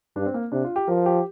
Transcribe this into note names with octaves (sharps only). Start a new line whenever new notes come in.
G2 D4
C4
A#3
C3 D4
F4
G4
F3 A#4
G4